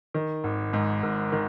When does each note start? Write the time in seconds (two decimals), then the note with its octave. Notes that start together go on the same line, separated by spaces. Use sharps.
0.14 D#3
0.44 G#1
0.73 G#2
1.03 G#1
1.32 D#3